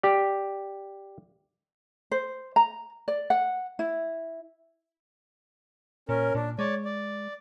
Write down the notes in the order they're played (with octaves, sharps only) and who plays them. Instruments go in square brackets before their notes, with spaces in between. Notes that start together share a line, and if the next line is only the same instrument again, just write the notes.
[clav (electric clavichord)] G4 D5
[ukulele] C5
A#5
D5
F#5
E4
[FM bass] A#2 [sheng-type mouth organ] C#4 A#4
[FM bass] A#2 [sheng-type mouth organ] D4
[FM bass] G#3 [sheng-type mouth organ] C#5 D5
[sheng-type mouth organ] D5